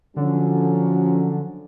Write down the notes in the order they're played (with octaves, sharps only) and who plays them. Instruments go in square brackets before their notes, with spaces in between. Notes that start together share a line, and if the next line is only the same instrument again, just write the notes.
[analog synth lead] D3 [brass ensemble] F3 F#3 C#4